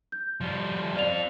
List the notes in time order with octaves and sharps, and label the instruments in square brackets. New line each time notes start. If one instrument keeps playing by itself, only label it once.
[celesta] G6
[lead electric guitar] F3 G3
[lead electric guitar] C4 F4 [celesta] D5 F7